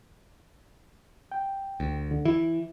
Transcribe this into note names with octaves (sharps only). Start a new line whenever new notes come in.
G5
D2
D3
E3 E4